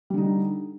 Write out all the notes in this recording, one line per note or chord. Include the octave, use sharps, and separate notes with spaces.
D3 G3 D#4